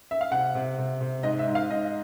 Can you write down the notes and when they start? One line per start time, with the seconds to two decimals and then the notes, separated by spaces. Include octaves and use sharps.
0.11 E5
0.21 F5
0.31 C3 F#5
0.55 C3
0.78 C3
1.01 C3
1.23 G#2 D#5
1.39 E5
1.47 G#2
1.55 F5
1.70 G#2 D#5